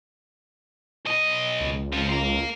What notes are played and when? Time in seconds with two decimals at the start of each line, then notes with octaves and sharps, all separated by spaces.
1.05 B1 D#5
1.60 C#2
1.93 C4 F4
2.10 A#3 F5